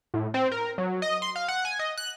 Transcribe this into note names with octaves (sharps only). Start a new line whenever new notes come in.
A2
C4
A#4
F#3
D#5
C6
F5
F#5
G#5
D#5
F#6